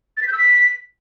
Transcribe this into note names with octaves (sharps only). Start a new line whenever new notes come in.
A6
B6
G6
E6
B6